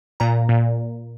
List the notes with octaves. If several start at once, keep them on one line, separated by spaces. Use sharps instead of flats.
A#2 A#5
A#2